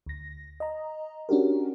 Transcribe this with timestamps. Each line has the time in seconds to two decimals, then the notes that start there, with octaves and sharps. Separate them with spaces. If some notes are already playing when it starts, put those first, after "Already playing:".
0.06 D2 A#6
0.60 D#5 A#5
1.29 C#4 D4 F#4 G4 A#4